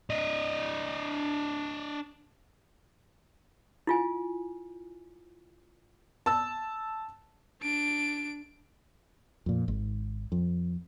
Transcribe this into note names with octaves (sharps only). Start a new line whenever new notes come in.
D4 D#5
E4 F4 G#5
A5 E6
D4 D7
F2 A#2
G#1
F2